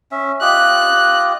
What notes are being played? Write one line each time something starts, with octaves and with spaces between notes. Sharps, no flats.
C#4 E5
F4 G4 D#5 F#6